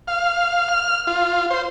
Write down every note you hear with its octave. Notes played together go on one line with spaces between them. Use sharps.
F5
F6
F4
C5